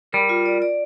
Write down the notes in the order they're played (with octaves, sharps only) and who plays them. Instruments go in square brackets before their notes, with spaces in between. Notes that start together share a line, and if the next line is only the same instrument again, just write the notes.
[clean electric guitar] G3 [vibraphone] A#4
[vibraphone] F4
D5
D5